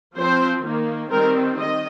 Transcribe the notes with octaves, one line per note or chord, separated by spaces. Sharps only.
F3 C4 C5
D#3 A#3
D#3 G3 C4 A#4
D#3 D#5